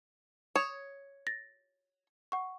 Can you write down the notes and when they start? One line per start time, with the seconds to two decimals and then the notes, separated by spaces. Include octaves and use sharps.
0.56 C#5 D#6 E7 F7
1.27 A6 A#6
2.32 F#5 C#6